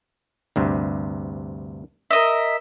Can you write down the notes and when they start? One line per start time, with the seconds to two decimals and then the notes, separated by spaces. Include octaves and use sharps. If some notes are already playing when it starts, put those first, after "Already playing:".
0.56 D2 G2 C3
2.11 A#4 D#5 E5